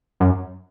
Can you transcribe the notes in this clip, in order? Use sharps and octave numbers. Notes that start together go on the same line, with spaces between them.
F#2